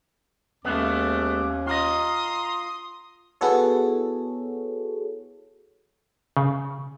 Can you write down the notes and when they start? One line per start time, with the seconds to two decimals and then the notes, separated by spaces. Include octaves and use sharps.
0.65 D#2 G#3 A3 B3 C#4 D6
1.67 F4 D#5 A#5 C6 D#6
3.41 B3 E4 F#4 G#4 A4 C#5
6.37 C#3